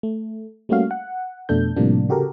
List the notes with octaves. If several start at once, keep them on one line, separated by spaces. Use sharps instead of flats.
A3
G3 A3 A#3 C#4 F#4 F5
F#5
F2 B2 A3 D4 A4 G6
A2 C3 F3 G3 A#3 D4
C#3 F#4 G4 A4 A#4